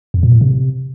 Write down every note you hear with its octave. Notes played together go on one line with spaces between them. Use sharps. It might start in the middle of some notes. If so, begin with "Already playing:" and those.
F2
A#2
A2
C3